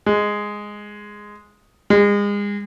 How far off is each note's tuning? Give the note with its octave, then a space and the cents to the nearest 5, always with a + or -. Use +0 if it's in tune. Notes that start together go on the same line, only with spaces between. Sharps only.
G#3 -5
G#3 -35